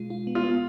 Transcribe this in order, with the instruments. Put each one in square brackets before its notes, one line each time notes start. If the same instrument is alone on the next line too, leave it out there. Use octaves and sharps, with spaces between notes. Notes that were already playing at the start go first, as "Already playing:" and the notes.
Already playing: [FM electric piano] B2 G#3 F4
F4
B3
[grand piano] F4
[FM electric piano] B3